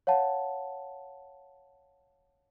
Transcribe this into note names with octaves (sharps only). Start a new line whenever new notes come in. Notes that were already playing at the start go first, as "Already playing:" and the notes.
C#5 F5 F#5 A5